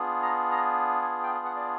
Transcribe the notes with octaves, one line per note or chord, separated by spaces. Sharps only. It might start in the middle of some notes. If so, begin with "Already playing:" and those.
Already playing: B3 D4 F4 G#4
A#5
A#5
G#5
G5
F#5
D5